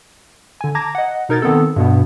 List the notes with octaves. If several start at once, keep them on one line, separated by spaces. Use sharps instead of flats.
D3 G#5
A5 A#5 D6 G#6 A#6
D#5 F#5
B2 D#4 A#4 G#6 A6
D#3 B3 C4 A4
G2 B2 B3